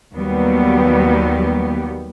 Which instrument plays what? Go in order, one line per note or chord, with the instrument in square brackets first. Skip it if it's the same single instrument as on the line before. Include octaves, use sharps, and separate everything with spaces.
[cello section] D#2 F#3 G3 B3 G4